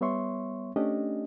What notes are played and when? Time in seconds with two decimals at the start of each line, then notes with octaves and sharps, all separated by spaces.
0.01 G3 B3 C#5 E5 C6 C#6
0.76 A3 C#4 D4 G4 D#5